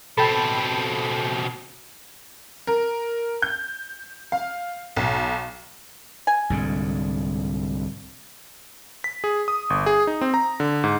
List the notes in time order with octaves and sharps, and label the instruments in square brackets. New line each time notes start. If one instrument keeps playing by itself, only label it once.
[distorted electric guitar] B2 C4 [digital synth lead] A4 [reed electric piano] G5 A5 B5
[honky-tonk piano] A#4
G6
F5
B1
[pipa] G#5
[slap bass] C2 G#2 D3
[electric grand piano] B6
G#4
D#6
G1
G#4
D#4
C4
A#5
D3
G#2